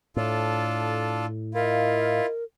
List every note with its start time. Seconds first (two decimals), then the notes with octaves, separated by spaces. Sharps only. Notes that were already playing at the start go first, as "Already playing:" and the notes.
0.16 A2 D4 F4 A4
1.54 E4 F4 A#4 D#5 F5